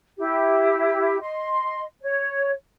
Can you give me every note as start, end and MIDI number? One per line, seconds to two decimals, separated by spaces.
0.18 1.17 64
0.18 1.17 67
1.21 1.83 75
1.21 1.83 84
2.02 2.52 73